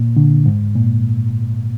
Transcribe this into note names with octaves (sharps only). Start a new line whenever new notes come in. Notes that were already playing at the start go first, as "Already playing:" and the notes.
Already playing: A#2
D3
G#2
A#2